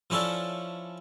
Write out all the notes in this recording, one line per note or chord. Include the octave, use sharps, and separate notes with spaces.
F3 C#4 E4 A4 D5